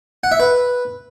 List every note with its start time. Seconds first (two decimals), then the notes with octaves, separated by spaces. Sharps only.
0.24 F#5
0.32 E5
0.40 B4